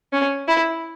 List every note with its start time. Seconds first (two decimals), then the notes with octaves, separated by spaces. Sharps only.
0.13 C#4
0.48 E4